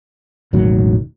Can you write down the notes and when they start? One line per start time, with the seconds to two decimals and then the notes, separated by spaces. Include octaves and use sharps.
0.53 E1 A1 D#3 F#3